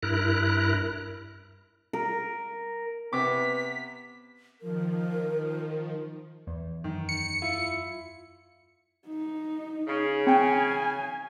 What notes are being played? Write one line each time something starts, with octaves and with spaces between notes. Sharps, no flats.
G2 E4 A#4 F#6
A#4
C3 B3 D6 B6
D#3 F3 A#4
E2
F#2 D#3
C#7
E4 F4
D#4
C#3
C4 G5 G#5